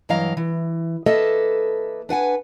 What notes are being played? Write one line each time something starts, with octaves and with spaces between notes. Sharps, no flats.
G2 E3 F#3 D#5 F5 A#5
E3
A#3 A4 B4 D#5 E5
D4 B4 F#5 G#5